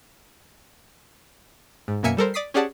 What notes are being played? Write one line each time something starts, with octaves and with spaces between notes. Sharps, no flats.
G#2
F#2 B2 A#3 E5 G#5 C#7
G3 A4 A#4 C5
D5 D6 D#6 B6 C7
C#4 G4 G#4 D5 F#5 A5